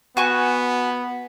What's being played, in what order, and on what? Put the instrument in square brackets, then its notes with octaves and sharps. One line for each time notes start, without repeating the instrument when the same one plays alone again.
[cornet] B3 [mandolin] F#4 G#5 C#6